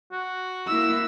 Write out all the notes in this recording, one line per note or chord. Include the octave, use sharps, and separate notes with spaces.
F#4
A#3 E4 E6